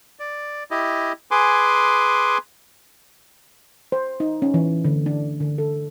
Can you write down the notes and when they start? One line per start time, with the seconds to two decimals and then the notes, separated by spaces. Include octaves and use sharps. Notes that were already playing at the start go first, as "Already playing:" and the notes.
0.19 D5
0.71 E4 G4 D#5
1.31 G#4 B4 G#5 C6 D6
3.92 C5
4.20 D#4
4.42 C#4
4.54 E3
4.85 D3
5.06 D4
5.40 D3
5.58 A4